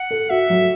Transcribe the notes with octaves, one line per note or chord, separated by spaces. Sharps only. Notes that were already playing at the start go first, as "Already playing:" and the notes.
Already playing: F#5
A4
F#4 E5
F#3